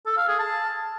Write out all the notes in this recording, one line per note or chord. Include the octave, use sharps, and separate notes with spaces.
A4
F5
G#4
A5